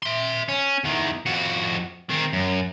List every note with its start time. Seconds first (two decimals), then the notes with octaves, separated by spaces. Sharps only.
0.02 E5 C6
0.49 C#4
0.84 E2 D#3
1.26 F2 F#4
2.09 D#3 C4
2.33 F#2